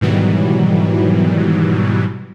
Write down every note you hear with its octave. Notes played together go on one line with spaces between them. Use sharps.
G#2 B2 D#3 E3 F#3 G3